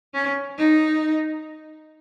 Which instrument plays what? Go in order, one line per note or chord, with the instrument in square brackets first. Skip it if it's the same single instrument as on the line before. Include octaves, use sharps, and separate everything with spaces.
[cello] C#4
D#4